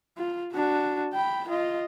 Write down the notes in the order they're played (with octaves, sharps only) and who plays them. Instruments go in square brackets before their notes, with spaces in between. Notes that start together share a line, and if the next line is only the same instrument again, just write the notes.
[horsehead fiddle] F4
D4 F#4
G5 B5
F4 D#5